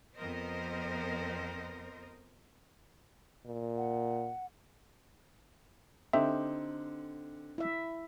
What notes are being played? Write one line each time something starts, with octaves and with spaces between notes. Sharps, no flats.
F2 B3 A#4 C5 D#5
A#2
F#5
D3 C4 D#4 G4 E5
E4 E5